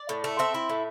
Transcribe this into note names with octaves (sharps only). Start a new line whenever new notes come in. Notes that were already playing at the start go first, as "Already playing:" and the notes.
Already playing: D5
A2
A3
C4 E5
E4
A2